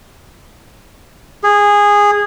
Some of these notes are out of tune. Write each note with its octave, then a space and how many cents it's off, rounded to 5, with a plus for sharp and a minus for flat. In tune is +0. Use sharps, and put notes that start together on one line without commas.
G#4 -15